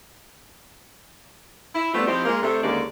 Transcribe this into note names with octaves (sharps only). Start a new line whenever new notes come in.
E4
G3 A3 B3 C4 D4 F4
F3 C4 D#4 E4 G4
G#3 A#3 F4 A#4
C3 A3 D4
D#2 D3 G#3 A#3 C#4 D5